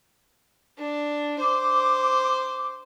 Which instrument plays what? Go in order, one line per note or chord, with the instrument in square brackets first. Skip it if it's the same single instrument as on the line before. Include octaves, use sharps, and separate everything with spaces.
[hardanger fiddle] D4
[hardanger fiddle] C5 [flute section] D6